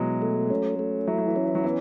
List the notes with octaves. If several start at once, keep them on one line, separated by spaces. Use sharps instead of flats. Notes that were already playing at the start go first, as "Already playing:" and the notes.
Already playing: B2 E3 F#3 G#3
A3
C#4
A3
F#3 E4
F#3
E3
C#4
E3
F#3
E3 B3